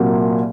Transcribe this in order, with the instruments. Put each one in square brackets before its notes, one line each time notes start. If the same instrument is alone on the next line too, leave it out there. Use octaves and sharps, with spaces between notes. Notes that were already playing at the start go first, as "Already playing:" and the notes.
Already playing: [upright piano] C2 A#2 F#3 A#3